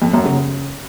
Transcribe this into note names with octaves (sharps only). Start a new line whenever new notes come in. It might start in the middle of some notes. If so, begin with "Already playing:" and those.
F2
F#2
C#3